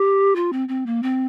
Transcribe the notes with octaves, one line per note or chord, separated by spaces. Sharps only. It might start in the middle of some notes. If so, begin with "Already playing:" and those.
Already playing: G4
F4
C4
C4
A#3
C4